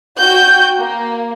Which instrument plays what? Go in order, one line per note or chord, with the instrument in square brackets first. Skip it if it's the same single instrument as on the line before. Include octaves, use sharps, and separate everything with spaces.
[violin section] F#4 G5 G6
A#3